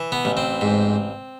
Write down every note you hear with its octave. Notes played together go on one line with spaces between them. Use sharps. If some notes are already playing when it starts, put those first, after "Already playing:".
Already playing: E3
B3
A1
C4
G#2